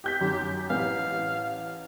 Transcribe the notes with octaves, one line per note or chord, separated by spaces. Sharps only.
G4 G6 B6
F#2 D#3 G4
A1 F5